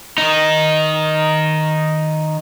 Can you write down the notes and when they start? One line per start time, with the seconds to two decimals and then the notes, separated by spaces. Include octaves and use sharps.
0.18 D#3 D#4